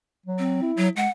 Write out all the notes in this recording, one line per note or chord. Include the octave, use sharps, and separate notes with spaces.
F#3
C4
E4
F#3
G#3 F#5